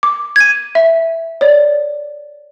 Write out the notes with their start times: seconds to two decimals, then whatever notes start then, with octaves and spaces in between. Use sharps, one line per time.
0.03 D6
0.36 G#6 D#7
0.75 E5
1.41 C#5 D5